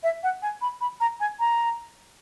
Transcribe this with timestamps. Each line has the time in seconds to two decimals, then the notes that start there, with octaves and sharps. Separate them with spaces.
0.03 E5
0.23 F#5
0.42 G#5
0.62 B5
0.81 B5
1.00 A#5
1.20 G#5
1.40 A#5